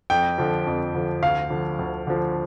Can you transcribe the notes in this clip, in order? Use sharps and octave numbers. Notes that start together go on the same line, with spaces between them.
F2 G5
D3 F3
F2
D3 F3
D2 F5
D3 F3
D2
D3 F3